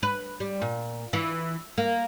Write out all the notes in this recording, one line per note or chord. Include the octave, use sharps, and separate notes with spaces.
B4
G3
A#2
E3
A#3